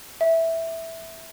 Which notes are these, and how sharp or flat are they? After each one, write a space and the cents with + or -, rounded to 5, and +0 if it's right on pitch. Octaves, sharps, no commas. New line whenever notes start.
E5 -5